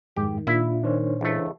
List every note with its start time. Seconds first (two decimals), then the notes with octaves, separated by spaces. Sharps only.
0.17 F2 G#2 D#3 G#3 G4
0.47 A#2 D4 E4 F4 E5
0.84 D#3 D4 C5 C#5
1.21 C#2 E3 A3